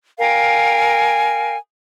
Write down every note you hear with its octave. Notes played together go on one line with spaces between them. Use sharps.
A#4 F5 G5 G#5